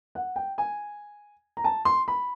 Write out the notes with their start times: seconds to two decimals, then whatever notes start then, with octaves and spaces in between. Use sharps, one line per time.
0.15 F#5
0.36 G5
0.58 G#5
1.57 A#5
1.64 A5
1.85 C6
2.08 B5